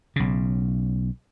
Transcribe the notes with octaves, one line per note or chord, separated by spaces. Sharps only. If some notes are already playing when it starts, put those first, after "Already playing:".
B1 C#3